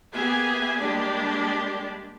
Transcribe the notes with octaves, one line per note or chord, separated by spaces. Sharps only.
A#3 B3 G4 G#4 E5 G#5
G3 G#3 A#3 D4 G4 D5